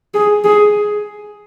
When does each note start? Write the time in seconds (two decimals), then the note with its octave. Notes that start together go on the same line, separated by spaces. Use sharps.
0.14 G#4
0.44 G#4